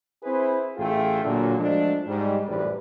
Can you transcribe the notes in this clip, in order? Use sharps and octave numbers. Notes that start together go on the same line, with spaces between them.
C4 E4 G#4 B4 C5
A1 A3 F4 G#4 E5 G5
A#2 D3 F#3
F3 F#3 G#3 A3 D4
G#2 G3
A1 F#2 C3 G3 B4 D5